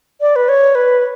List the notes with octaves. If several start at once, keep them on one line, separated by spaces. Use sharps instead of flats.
D5
B4
C#5
B4